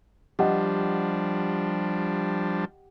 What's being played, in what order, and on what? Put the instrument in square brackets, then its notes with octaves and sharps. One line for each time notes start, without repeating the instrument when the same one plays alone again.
[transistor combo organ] F3 G3 D4 [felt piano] G4 D#5 F#5